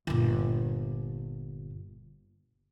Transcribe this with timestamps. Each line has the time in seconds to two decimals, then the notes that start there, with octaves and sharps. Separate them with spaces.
0.07 G1 A#2